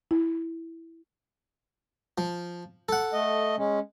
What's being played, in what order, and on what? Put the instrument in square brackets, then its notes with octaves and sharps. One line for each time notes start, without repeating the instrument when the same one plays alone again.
[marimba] E4
[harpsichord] F3
A4 F#5
[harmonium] A3 D#5
G#3 C#4